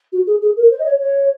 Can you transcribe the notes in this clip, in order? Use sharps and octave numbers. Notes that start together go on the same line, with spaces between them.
F#4
G#4
G#4
A#4
C5
D#5
C#5
C#5